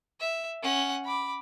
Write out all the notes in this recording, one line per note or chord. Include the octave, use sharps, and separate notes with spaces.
E5
C#4 F#5
B5 D6